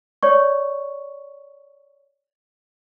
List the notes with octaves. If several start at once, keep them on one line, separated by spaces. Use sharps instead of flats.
C#5 D5 C#6